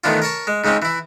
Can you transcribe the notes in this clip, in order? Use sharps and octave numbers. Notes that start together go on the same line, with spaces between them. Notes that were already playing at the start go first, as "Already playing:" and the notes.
A2 D#3 E3 B3 D4 F4
A#4 C#5 A5 C#6
G#3
G#2 C#3 G#3 C4 C#4
E3 E4